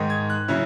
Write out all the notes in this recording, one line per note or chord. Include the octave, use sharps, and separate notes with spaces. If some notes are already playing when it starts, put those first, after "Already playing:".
Already playing: G#2 D#3 G#3
G#6
F#6
C#3 F#3 C#4 E4